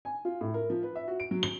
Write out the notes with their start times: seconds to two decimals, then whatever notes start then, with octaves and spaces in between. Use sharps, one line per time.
0.05 G#5
0.25 F4
0.41 A2
0.54 A#4
0.70 F3
0.83 B4
0.96 E5
1.08 F#4
1.20 D7
1.31 F#3
1.43 G7